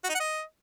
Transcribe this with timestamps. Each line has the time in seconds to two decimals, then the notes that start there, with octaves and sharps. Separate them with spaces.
0.04 F#4
0.09 D#4
0.15 F#5
0.20 D#5